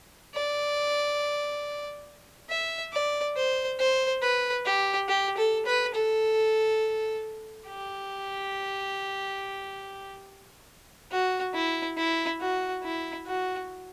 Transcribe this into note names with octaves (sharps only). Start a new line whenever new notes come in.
D5
E5
D5
C5
C5
B4
G4
G4
A4
B4
A4
G4
F#4
E4
E4
F#4
E4
F#4